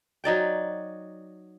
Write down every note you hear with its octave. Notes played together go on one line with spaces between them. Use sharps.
F#3 D#4 D5 G5